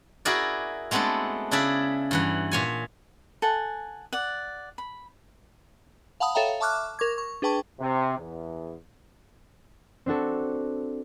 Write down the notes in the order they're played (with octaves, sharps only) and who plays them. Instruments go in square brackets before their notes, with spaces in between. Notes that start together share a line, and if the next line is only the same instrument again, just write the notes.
[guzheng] E4 F#4 G#4 A#4 D5
G#3 A3 B3 C4 D4 A4
C#3 D4 E4 G#4 D5 E5
G2 E3 F#5
A#2 C#5 G#5
[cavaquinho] A4 F#5 G#5
D5 F#5
B5
[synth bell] F5 F#5 A5 B5 D#6
A4 C#5 E5 F5 G5 A#5
E5 A5 C#6 D6 F6 F#6
A#4 C#6 D6 G#6
C#6
D4 G#4 B4 G5 A5 C#6
[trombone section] C3
E2
[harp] C4 D4 F#4 A4